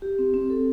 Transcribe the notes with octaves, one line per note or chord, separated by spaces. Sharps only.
G4
C4
C4
A4